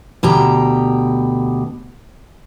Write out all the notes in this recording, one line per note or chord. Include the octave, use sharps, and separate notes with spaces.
D2 B2 G4 A#5